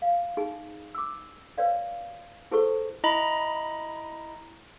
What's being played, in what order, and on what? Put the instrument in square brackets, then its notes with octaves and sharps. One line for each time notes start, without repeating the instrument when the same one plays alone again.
[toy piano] F5
D#4 G#4 G#5
D6 E6
B4 C#5 D5 F5
E4 G#4 A4 B4 C5 C#6
[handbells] E4 D#5 A#5 B5